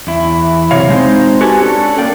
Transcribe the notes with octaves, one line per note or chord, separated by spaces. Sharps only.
E2 E4
C3 F#3 C#5 F5
G#3 C4 D#4 C5
F#4 G4 A4 B4 G#5
C#4 D4 A4
A#3 A#4 D5 F5 G5